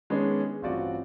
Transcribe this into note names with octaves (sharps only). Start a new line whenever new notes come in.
D#3 G#3 B3 C#4 D4
G#4
A1 G2 C4 F4 F#4 D5